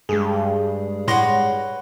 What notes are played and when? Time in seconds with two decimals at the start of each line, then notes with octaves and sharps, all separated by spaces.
0.09 G2 G#3 G#4
1.08 A2 B4 C#5 F#5 C6 A#6